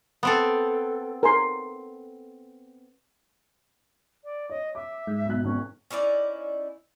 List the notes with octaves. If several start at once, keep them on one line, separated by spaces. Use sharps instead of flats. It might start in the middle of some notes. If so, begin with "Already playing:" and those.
B3 C4 A4
A#4 G#5 C6
D5
C#5 D#5
E5 D6
G#2
B1 B2 F#6
G#1 C#4
C#4 D#4 E4 D5